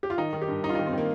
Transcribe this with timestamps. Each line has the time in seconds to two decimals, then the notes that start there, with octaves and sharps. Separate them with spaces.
0.03 G4
0.10 F4
0.18 D#3 D#4
0.33 D#3
0.42 G4
0.48 G2
0.63 G2 D#4
0.69 F4
0.75 D#3 D#4
0.86 C4
0.93 D#3 A#3